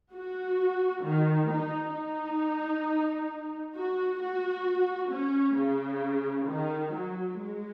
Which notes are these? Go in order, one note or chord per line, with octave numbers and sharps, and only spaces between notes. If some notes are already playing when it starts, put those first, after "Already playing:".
F#4
D#3
D#4
D#4
F#4
F#4
C#4
C#3
D#3
F#3
G#3